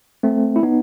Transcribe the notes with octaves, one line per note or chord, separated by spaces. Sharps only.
A3 C4
E4
B3 D#4